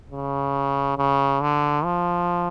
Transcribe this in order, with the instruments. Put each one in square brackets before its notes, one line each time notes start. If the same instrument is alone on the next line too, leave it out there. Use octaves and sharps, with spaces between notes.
[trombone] C#3
C#3
D3
F3